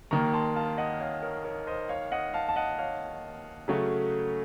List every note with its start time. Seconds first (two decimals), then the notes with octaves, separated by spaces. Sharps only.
0.11 D#2 D#3 A#3 A#5 C#6
0.33 A5 C6
0.56 F5 A5
0.78 D#5 F#5
1.00 C#5 F5
1.22 A#4 C#5
1.45 A#4 C#5
1.67 C5 D#5
1.89 C#5 F5
2.12 D#5 F#5
2.34 F5 A5
2.49 A5
2.56 D#5 F#5
2.78 C#5 F5
3.68 C#3 F#3 A3 C#4 F#4